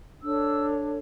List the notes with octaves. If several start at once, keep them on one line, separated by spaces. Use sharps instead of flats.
D4 A4 C#5 E6